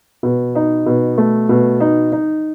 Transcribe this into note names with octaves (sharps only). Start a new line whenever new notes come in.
B2
D#4
B2
A3
B2
D#4
D#4